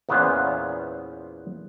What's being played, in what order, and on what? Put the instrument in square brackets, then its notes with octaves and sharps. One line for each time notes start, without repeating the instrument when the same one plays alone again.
[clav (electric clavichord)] E2 A#2 B3 C#4 C5 F5